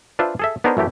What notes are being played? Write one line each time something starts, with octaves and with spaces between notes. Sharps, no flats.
D4 F4 B4 C5 E5
G#4 A4 E5
B3 D4 D#4 G#4 A#4 C5
F#2 E3 A3 G4